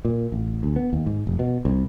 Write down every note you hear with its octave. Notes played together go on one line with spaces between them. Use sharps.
A#2
A1
D2
B3
D#2
G#2
F1
B2
C2